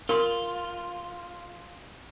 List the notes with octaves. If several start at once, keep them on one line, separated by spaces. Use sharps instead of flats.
F4 A#4 C6